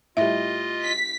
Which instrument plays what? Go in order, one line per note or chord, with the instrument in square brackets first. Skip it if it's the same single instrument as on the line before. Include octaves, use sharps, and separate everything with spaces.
[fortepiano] A2 G3 [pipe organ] F4 D#5 [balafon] E5
[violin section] B6